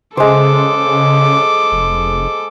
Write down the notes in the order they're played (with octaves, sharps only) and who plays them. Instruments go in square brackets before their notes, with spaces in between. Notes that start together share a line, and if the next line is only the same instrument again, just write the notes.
[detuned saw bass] C#3 [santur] G#3 C5 [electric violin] A4 D6
[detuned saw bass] F1